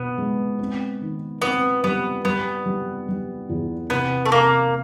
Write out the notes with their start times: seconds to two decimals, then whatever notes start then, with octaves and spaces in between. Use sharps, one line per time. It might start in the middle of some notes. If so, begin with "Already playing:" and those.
Already playing: B2 B3
0.18 G#3
0.59 C4
1.01 D#3
1.42 B3 C4
1.84 G3 B3
2.25 G3 B3
2.66 G3
3.08 G3
3.49 E2
3.90 C3 B3
4.25 A3
4.31 C3 A#3